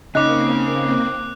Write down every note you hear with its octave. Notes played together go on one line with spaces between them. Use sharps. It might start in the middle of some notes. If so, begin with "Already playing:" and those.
C#3 A#3 C4 D#4 D6 F#6